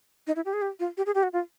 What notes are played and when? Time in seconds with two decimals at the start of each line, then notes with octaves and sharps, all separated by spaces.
0.27 D#4
0.36 E4
0.45 G4
0.53 G#4
0.62 G4
0.80 F4
0.97 G4
1.06 G#4
1.15 G4
1.23 F#4
1.33 F4